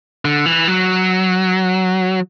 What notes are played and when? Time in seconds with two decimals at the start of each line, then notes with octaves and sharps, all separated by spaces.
0.25 D3
0.46 E3
0.68 F#3